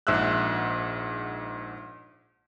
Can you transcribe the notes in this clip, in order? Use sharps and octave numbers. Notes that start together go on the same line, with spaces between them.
A#1 G#2 E5 E6 F#6